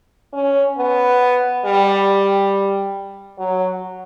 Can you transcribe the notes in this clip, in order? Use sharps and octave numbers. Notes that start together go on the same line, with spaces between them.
C#4
B3
G3
F#3